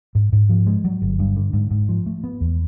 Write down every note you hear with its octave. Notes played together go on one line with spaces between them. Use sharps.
G#2
G#2
F3
G#3
F#3
G1
G2
D3
G#2
G#2
F3
A3
B3
E2